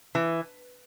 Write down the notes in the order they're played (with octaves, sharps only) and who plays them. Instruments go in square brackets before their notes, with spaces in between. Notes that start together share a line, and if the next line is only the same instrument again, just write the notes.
[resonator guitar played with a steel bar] E3